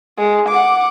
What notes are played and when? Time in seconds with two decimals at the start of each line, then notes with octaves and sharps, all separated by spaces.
0.18 G#3
0.49 F#5 D6